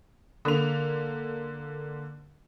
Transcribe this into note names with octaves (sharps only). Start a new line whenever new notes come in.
D3 A#3 F7